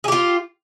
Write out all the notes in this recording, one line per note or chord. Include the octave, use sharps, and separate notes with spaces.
F4 G4 G#4